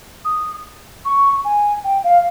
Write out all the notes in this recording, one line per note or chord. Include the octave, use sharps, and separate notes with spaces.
D#6
C#6
G#5
G5
F5